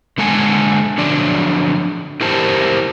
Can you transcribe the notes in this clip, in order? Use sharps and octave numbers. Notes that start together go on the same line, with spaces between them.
D3 G#3 A4 F#5 G#5
D3 F3 F#3 D4 D5
E4 G4 A#4 C5 A5